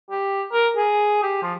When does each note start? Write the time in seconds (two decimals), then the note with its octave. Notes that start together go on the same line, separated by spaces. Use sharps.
0.11 G4
0.53 A#4
0.77 G#4
1.23 G4
1.42 F3